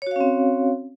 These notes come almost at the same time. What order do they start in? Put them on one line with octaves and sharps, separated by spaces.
C#5 F#4 F5 C#4 C4